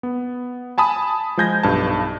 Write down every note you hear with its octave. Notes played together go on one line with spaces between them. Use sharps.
B3
G#5 A5 B5 D#6
F3 G#3 G#4 G6 G#6 A#6
B1 G2 A5